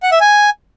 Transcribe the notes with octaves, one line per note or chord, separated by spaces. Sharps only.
F#5
E5
G#5